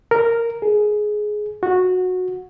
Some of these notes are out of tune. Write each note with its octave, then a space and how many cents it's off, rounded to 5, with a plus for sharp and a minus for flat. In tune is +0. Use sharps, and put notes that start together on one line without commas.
A#4 -5
G#4 +15
F#4 -15